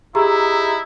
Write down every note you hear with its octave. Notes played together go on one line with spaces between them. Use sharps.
D#4 E4 G4 G#4 A#5